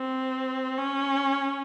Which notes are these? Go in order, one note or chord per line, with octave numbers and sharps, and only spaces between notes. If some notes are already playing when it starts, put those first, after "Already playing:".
Already playing: C4
C#4